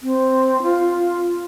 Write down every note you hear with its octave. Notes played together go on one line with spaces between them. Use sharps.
C4
F4